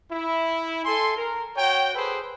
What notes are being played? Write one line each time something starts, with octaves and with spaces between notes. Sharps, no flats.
E4
A4 G#5 C6
A#4
F#4 C#5 G5
G#4 A4 B4 C5